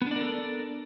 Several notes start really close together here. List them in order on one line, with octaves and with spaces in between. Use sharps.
B3 D4 D5 A#4 A4